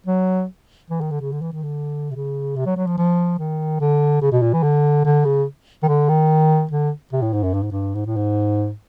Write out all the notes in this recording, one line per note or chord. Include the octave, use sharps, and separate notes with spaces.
F#3
E3
D#3
D3
C#3
D3
E3
D#3
D3
C3
C#3
C3
F#3
F#3
F3
F3
D#3
D3
C#3
B2
A#2
E3
D3
D3
C#3
D#3
D3
D#3
D3
C3
A2
G#2
F#2
G2
G#2
G2
G#2
A2
G#2